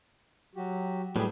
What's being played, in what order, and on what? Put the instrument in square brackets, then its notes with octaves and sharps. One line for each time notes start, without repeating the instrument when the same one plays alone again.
[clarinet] F#3 [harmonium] F#4 G4
[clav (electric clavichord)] A2 [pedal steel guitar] F#3 G3 B3 [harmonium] A3 G4 G#4